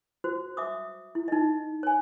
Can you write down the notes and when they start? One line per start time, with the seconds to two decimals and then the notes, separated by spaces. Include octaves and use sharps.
0.24 F#4 C5
0.57 E5 D6 D#6
1.15 E4
1.28 D#4 D#5
1.83 C#5 G#5